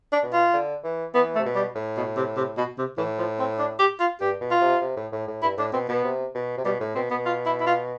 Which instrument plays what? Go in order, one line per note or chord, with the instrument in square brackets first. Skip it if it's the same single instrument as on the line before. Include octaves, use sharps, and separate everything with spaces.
[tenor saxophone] D4
[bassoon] B2
[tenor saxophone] F4
[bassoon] D3
E3
[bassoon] E3 [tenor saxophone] B3
[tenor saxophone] A3
[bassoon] C3
B2
[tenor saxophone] G3
[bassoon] A2
[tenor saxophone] B2
C3
C3
B2
C3
[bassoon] A2 [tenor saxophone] E3
[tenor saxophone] F3
C4
D4
G4
F4
[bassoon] G2 [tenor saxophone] G4
[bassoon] B2
[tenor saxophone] F4
[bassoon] C3
C3
A2
A2
A2
[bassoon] G2 [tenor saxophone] E4
[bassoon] A2 [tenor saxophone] D4
[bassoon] B2 [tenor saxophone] C4
[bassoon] B2 [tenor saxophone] B3
[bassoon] C3
B2
C3
[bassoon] B2 [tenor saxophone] G3
[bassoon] A2
[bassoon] B2 [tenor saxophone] C4
[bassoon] B2 [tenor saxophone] B3
[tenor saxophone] F4
E4
E4
F4